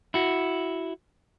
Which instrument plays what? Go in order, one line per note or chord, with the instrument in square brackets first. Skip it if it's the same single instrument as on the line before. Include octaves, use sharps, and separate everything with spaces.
[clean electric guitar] E4 F#4